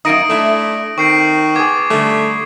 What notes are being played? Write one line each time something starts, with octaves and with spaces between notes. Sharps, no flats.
F#2 A#3 D#4 D#6 A#6 D7
A3 D4 E4
D#3 C4 C#6 C7 D7
B3 G#4 D6 G#6
D3 G3 A3